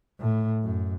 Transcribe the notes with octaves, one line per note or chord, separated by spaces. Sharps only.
A2
F#2